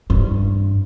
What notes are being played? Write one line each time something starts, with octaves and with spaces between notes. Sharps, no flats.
G2